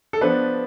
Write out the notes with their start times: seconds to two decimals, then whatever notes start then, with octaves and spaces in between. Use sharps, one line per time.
0.13 A4
0.21 F3 B3 D4 B4